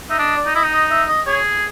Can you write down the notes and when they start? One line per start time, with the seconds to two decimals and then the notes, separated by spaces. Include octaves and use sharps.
0.10 D#4 E5
0.19 D4 D#5
0.37 D5
0.46 D#4
0.55 E4 D#5
0.63 D#4
0.73 D#5
0.91 E5
1.09 D#5
1.27 G#4 C#5